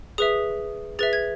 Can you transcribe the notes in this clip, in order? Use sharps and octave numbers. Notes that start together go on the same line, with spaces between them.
G#4 B4 E5 D#6
G#4 B4 E5 A6
G#6